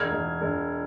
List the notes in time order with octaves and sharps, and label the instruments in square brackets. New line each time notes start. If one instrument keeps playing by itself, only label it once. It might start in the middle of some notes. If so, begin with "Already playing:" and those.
Already playing: [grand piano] E1 [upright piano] F6 G#6
[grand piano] E1
E1